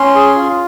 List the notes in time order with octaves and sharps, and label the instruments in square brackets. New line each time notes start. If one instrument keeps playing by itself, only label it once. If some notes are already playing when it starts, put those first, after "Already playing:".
Already playing: [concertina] C#4 C6
G#4
F4